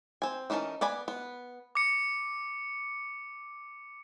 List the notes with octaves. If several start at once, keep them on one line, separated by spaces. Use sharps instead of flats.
C4 G#5
E3 C#4 D#4 A#4 A5
B3 D5 G#5 B5
B3
D6 C#7